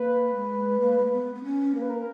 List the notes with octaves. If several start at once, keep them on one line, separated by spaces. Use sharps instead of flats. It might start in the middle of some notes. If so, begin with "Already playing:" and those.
Already playing: A#3 B4
G#3
A#3
G#3
A#3
B3
B3
C#4
A#3 A#4
B4
A#4